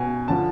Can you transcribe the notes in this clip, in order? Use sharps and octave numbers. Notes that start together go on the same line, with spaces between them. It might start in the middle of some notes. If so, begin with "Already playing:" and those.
Already playing: B2 G#5
D3 F3 A5